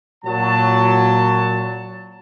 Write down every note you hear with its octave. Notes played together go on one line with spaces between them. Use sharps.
A#2 F#3 A5